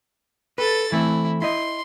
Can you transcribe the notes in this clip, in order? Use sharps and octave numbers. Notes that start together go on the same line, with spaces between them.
A4 B4 A6
E3 A3 C4 E4
E4 D#5 C6